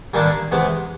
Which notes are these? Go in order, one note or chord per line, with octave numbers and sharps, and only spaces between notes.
G2 D#3 G3 A#3 D4 G#4
C3 E3 G#3 B3